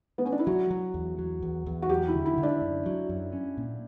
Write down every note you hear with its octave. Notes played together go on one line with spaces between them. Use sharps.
B3
C#4
D4
E4
F#3 F#4
F#3
E2
F#3
E2
E2
F#4
F#3 G4
E4
D3
E4
D3
D4
F#2
F#3
F#2
C#4
A#2